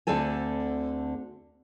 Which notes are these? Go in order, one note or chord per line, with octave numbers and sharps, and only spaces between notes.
D2 D3 C4 A4 G#5